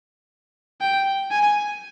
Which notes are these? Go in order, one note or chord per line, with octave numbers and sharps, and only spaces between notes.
G5
G#5